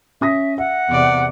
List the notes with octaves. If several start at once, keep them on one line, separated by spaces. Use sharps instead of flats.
C#4 E5 D#6 A#6
E5 F#5
E2 C3 D5